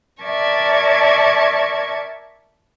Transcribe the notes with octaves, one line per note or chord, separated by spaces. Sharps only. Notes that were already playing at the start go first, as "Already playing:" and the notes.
A#4 D5 E5 A5 C#6 G#6